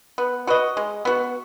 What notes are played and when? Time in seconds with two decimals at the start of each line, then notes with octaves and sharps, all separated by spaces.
0.18 B3
0.47 F#4 B4 D#5
0.77 G#3
1.05 B3 F#4